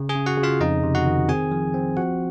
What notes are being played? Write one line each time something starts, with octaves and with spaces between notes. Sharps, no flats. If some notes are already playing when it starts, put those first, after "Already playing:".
Already playing: C#3
G#4 G#5
C#3
F#4 F#5
C#3
F4 F5
F2 D#4 D#5
C3
F#4 F#5
D#3
C4 G#4 G#5
F3
C4
F3 F#4 F#5